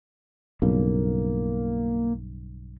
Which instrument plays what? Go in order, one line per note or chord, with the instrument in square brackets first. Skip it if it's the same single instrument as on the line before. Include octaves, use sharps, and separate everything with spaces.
[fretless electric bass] B1 G2 C#3 [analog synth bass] A#3